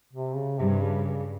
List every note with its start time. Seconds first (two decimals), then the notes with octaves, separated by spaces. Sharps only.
0.13 C3
0.35 C#3
0.58 G2 C3
0.82 C#3
1.04 C#3